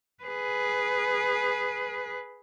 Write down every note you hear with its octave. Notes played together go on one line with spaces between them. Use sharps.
G#4 B4